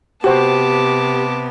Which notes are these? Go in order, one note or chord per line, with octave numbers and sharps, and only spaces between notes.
C3 B3 F#4 G4 C5 A5 D6